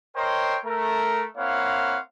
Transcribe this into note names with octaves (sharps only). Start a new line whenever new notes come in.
A#4 C5 C#5 D#5 G5 C6
A3 A#4
A#3 C4 E4 C#5 F5 F#5